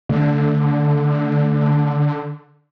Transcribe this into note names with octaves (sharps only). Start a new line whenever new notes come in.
D3 A3